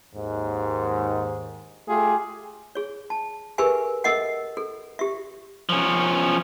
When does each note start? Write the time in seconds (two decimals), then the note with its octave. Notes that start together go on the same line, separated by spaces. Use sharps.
0.15 D#2 G#2
1.88 A3 F4 G4 G#4
2.75 G#4 C#5
3.10 A5
3.58 G4 G#4 A#4 B4 E5 G#5
4.04 A4 A#4 D#5 E5 F#5
4.57 A4
4.99 G4 E5
5.69 F3 C#4